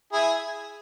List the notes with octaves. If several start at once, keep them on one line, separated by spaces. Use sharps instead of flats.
E4 G#4